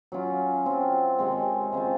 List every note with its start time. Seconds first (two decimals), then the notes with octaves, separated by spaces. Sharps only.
0.12 F#3 C#4 F4
0.66 F#3 C4 F4
1.19 C3 D#3 G#3 C4
1.72 C#3 G#3 C4 F4